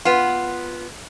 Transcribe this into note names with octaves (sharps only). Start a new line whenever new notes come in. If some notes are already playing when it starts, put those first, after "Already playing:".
B3 F4